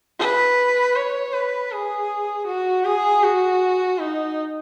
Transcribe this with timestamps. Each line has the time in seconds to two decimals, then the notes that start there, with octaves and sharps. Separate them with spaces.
0.19 B4
0.95 C#5
1.33 B4
1.71 G#4
2.47 F#4
2.84 G#4
3.23 F#4
3.99 D#4